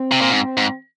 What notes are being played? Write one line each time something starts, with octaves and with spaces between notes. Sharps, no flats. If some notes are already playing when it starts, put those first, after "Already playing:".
Already playing: C4
C3
A#2
G#2 C4
G#2